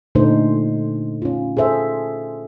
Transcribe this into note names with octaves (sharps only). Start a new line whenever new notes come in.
A#2 D3 A3 D4 D#4 C5
C#4 F4
G#4 A4 C5 E5